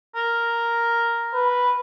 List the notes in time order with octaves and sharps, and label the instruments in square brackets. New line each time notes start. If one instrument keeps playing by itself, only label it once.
[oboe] A#4
[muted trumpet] B4